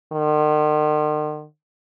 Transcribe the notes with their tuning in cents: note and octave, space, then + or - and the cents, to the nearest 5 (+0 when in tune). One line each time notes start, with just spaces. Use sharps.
D#3 -45